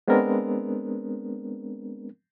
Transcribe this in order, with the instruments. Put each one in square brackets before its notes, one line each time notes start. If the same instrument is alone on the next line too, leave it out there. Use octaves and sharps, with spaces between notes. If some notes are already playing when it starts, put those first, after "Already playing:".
[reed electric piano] G#3 B3 C4 D4 A#4